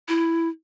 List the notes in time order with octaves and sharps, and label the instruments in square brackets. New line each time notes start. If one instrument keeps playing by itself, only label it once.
[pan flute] E4